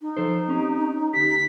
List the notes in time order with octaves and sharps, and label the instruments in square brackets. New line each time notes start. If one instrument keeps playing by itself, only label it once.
[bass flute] D#4
[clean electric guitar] F3 A4 C5
C4 C#4 G4
[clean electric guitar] D2 G4 [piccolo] B6